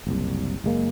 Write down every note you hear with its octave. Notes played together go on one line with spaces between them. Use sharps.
F#1 C2
F#1 G#3 A#3